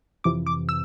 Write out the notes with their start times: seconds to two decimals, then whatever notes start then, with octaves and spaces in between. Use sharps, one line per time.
0.24 F2 C3 E3 D6
0.47 D6
0.69 E6